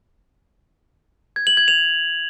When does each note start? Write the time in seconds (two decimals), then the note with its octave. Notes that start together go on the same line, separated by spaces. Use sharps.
1.36 G#6
1.47 F#7
1.57 G#6
1.68 F7